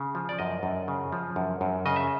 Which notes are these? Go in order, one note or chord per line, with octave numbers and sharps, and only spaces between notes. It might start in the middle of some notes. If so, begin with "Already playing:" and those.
Already playing: C#3
F3
D5
F#2 D#5
F#2
C#3
F3
F#2
F#2
C#3 D#5
E5